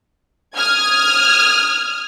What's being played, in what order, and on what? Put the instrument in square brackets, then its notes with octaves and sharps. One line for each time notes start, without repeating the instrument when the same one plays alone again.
[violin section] D#6 F6 G#6